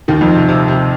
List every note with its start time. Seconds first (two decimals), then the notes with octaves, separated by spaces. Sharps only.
0.08 D#2 D#3
0.21 F2 F3
0.35 C3
0.49 C3
0.68 C3